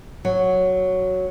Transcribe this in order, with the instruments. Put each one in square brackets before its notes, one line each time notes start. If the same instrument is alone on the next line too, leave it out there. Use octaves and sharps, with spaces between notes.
[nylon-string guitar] F#3